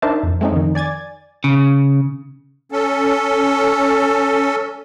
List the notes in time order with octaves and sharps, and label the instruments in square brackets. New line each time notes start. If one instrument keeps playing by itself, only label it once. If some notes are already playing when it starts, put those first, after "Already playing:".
[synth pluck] D4 D#4 A#4 C5 E5 A5
F2
G#3 A3 C4 C#4 D#4
F2 D#3
D5 G#5 G#6 A6
[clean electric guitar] C#3
[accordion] C#4 A4